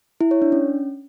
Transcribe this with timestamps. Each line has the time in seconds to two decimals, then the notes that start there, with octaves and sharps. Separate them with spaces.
0.21 E4
0.31 C#5
0.42 D4
0.52 C#4